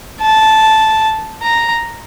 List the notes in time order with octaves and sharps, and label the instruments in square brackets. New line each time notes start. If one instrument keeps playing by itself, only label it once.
[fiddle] A5
A#5